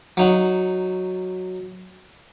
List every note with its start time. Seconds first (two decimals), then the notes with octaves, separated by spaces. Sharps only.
0.17 F#3 D#4 F#4